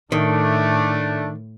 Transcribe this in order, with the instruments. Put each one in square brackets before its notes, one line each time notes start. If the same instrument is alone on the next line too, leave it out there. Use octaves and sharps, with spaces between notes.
[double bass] A2 [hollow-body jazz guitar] D#3 [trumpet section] A3 D4